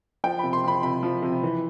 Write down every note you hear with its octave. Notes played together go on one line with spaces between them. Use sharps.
F3 G5
C3 B5
C6
F3 B5
C3 B5
F3
C3
E3